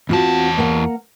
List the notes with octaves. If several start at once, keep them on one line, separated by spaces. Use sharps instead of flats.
E2 C4 F4 F#4 A5
A#3 A#4 F#5